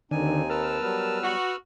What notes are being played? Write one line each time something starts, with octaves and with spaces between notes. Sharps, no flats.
D#2 D3 D#3 C4 D4 D#4 G#5
A#4 B4 A5 E6 F6
F#3 G3 B3
F#4